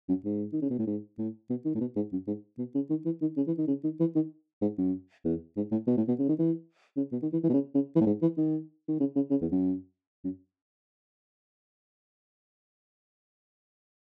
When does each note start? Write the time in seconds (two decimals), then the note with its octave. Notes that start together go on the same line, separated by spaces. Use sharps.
0.09 F#2
0.25 G#2
0.53 D#3
0.62 C#3
0.70 B2
0.79 A2
0.87 G#2
1.18 A2
1.50 B2
1.65 D#3
1.75 A2
1.80 B2
1.96 G#2
2.12 F#2
2.27 G#2
2.59 B2
2.75 C#3
2.90 D#3
3.05 E3
3.21 D#3
3.37 C#3
3.47 E3
3.58 D#3
3.68 C#3
3.84 D#3
4.00 E3
4.15 D#3
4.62 G#2
4.78 F#2
5.24 E2
5.56 G#2
5.72 A2
5.87 B2
5.97 A2
6.08 B2
6.19 C#3
6.29 D#3
6.39 E3
6.97 C#3
7.12 B2
7.22 D#3
7.33 E3
7.43 E3
7.49 B2
7.54 C#3
7.75 C#3
7.95 E3
8.01 A2
8.06 G#2
8.22 E3
8.37 D#3
8.88 D#3
9.00 C#3
9.15 C#3
9.31 C#3
9.42 E2
9.52 F#2
10.24 F#2